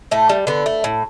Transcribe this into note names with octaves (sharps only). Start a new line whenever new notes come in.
A2 A3
G3
D3 B3
A3
A2